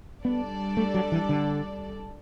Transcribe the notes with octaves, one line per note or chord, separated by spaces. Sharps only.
G3 B3 D4 A4 D5
A3
F#3
E3
D3